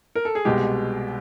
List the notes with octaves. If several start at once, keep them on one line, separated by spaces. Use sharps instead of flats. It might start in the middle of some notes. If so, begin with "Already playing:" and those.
A#4
A4
G#4
C2 B2 G#3 G4